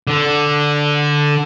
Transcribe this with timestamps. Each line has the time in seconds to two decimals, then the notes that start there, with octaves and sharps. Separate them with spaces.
0.07 D3